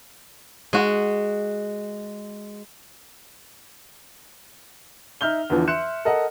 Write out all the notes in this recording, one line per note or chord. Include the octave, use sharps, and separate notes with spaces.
G#3 F#4
D#4 E5 F6 G6 G7
E2 D3 E3 F3
E5 C6 F#6 C#7 E7
A4 A#4 D#5 F#5